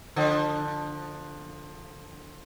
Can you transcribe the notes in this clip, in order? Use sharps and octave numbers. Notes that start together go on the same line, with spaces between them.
D3 F3